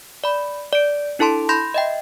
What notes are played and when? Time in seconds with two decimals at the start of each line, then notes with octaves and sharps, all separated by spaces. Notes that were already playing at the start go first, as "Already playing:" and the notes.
0.24 D5 B5
0.73 D5 D7
1.19 D4 E4 A4 A5 C6
1.49 B5 C6 G6 A#6
1.74 D#5 E5 G5